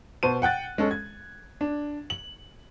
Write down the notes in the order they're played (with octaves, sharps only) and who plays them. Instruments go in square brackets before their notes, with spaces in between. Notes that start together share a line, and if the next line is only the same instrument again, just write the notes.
[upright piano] B2 C5 A5 D#7
F#5 G5 F#6 A6
G#3 C#4 A4
G#6
D4
F#7